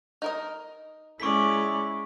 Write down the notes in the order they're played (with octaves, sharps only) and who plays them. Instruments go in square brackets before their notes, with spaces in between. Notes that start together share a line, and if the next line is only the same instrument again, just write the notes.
[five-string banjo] D#4 A#4 D#5
[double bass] G#3 E4 [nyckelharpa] C#4 D5 [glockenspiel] C#6 B6